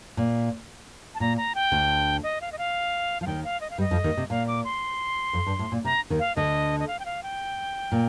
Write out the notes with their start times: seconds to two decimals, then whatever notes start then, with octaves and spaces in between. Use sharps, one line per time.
0.17 A#2
1.15 A5
1.20 A#2 A#5
1.37 A#5
1.55 G5
1.72 D2 D3
2.23 D#5
2.41 F5
2.52 D#5
2.58 F5
3.21 F3 F5
3.27 D#2 D#3 G5
3.44 F5
3.61 D#5
3.70 F5
3.78 G2 G3 D#5
3.91 F2 F3
4.04 D#2 D#3
4.17 C3
4.30 A#2 F5
4.47 D6
4.64 C6
5.33 F2
5.46 G2
5.59 A2
5.72 A#2
5.85 C3 A#5
6.10 D#2 D#3
6.19 F5
6.36 D2 D3 D#5
6.80 D#5
6.88 F5
6.99 G5
7.05 F5
7.23 G5
7.92 A#2